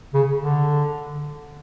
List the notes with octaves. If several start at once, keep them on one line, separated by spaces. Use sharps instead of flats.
C#3
D3